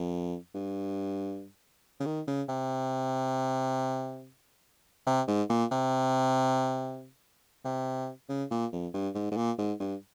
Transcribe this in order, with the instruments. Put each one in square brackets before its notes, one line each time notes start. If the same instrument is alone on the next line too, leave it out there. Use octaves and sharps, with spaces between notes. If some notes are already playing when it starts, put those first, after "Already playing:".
Already playing: [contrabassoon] F2
G2
C#3
D#3
C#3
C3
C3
G#2
A#2
C3
C3
C#3
A#2
F2
G2
G#2
G#2
A#2
G#2
G2